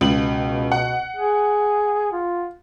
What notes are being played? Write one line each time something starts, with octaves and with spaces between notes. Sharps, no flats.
C#2 B2 F#7
F#5
G#4
F4